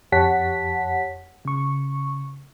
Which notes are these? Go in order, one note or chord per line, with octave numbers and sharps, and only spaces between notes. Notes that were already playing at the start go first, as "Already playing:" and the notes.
F2 G4 C#5 F#5 A5 B6
C#3 C#6